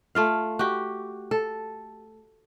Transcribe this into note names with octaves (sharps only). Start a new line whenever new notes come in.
A3 F4 F5
F#4 G4
A4